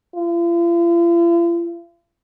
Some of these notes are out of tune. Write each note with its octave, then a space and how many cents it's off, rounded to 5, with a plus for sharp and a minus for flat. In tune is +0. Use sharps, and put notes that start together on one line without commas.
F4 -45